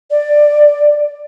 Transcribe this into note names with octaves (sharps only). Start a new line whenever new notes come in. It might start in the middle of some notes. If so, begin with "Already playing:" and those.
D5